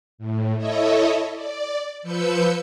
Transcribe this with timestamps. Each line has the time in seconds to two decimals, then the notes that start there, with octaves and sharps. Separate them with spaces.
0.18 A2
0.57 E4 A4 C#5 D#5 E5
1.33 D5
2.02 F3 B4 E6 G6 C#7